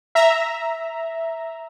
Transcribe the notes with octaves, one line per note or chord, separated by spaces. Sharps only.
E5 A#5